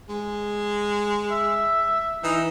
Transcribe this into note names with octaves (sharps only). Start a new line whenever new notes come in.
G#3
E5
E3 D#4